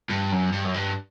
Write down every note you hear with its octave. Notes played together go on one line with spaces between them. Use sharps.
G2
F#2
G2
F#2
G2